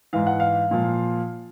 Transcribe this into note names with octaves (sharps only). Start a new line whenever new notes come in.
G#2 E3 F5
F#5
F5
A#2 F3